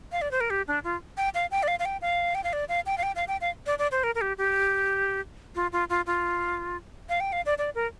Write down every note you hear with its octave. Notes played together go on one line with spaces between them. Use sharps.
F5
D5
C5
A#4
G4
D4
F4
G5
F5
G5
D5
F5
F5
G5
F5
G5
F5
D5
F5
G5
F5
G5
F5
G5
F5
D5
D5
C5
A#4
A#4
G4
G4
F4
F4
F4
F4
F5
G5
F5
D5
D5
A#4